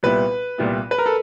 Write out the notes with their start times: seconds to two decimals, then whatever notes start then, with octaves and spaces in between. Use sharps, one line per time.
0.03 C2 A#2 G3 B3 E4 B4
0.58 C2 A#2 G3 B3 E4
0.91 B4
0.98 A#4
1.06 A4